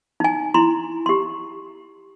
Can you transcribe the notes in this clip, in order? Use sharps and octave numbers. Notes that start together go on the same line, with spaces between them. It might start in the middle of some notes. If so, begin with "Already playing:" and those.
D#4 G#5
E4 A#5 C6
G4 C6